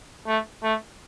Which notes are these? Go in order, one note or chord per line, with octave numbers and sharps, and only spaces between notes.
A3
A3